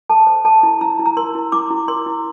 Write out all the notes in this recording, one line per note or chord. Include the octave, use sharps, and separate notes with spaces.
A4 A5
C5
A4 A5
E4
E4 A#5
E4
A#5
A#4 C6
E4
E4 D6
E4
A#4 C6
E4